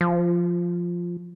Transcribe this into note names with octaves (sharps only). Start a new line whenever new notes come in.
F3